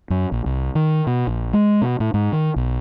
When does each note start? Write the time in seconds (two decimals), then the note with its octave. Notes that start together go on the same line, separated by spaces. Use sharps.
0.10 F#2
0.32 A#1
0.46 C2
0.75 D#3
1.07 B2
1.27 A#1
1.53 G#3
1.82 B2
2.00 A2
2.14 G#2
2.32 D#3
2.56 B1